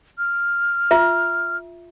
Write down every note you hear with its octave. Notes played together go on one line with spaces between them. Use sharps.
F6
F4 E5